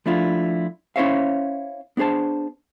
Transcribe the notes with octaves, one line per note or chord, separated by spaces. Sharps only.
F3 A3 D4 E4 F4
C#4 E4 C5 C#5 E5 F5
B3 D4 G#4 C5 A5